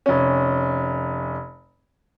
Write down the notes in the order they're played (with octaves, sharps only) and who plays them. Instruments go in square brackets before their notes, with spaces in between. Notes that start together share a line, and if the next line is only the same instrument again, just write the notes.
[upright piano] F1 C#4